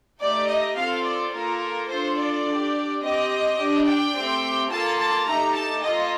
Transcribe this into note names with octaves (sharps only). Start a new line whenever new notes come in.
A3 D#4 G4 D5
D#5
C4 F4 A4 F5
D5
A#3 F4 A4 A#4
D4 F4 A4 C5
D5
D4 G4
C4 G4 D#5
D4 G4
G5
A3 C4 G4
A#3 F4 A4 A5
A5
A3 D#4 G4 A#5
A5
A#3 F4 A4 D#5